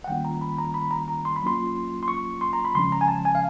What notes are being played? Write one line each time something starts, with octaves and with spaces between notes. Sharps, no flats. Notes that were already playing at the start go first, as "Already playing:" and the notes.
F#5
D#3 G3 A#3 C#4 F4 G5
A#5
B5
A#5
B5
A#5
A#5
C6
B5
F#3 A#3 C#4 F4 C6
C6
C#6
C6
A#5
B5
C#3 F3 G#3 C#4 C6
A#5
G#5
A5
G#5
F5